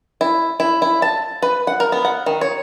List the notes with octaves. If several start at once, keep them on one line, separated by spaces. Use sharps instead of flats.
E4
E4
E4
A5
B4
F#5
A#4
B3
F#5
D#3
C#5